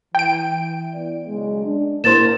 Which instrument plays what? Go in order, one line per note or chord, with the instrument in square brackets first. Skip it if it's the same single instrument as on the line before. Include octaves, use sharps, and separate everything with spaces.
[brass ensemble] E3 [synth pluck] G5 D7
[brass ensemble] B3 E4 D5
B1 C#3 G#3
D4
[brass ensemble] C2 C3 [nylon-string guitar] A#3 C5 [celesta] E4 A6 E7